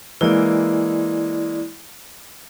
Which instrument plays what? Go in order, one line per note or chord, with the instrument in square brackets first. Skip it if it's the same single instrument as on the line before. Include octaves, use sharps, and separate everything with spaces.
[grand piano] E3 G#3 A#3 [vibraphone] E4 D5